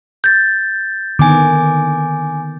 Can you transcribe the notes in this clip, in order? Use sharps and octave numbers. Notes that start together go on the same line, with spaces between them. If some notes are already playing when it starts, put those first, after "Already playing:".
G6 A6
D3 D#3 B3 G#5 D6